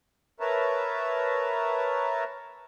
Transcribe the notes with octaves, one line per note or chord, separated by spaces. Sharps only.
A#4 B4 C#5 E5 A5 A#5